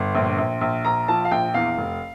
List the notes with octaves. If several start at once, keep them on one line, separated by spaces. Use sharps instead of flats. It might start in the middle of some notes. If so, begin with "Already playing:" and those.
Already playing: G1 C6
A#1
A#1
A#1
A#1 A#5
F3 A5
F5
A#1 G5
E2 F5
F1